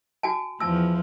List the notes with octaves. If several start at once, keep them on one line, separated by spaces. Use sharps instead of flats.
F#4 G#5 A5
E2 F3 A5 E6